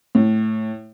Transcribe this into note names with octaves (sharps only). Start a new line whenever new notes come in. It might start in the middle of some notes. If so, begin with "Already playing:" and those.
A2